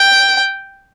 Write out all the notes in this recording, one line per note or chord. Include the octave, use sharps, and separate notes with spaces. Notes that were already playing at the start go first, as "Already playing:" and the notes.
Already playing: G5